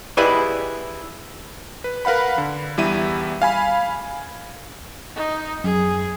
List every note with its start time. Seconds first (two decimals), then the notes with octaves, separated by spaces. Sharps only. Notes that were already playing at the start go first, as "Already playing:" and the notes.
0.17 E4 G4 G#4 B4 D5 D#5
1.84 B4
2.05 A#4 B4 F5 F#5 B5
2.38 D3
2.77 E2 G3 E4 E5 D#7
3.42 F5 G#5 B5
5.16 D#4
5.64 F#2 G#4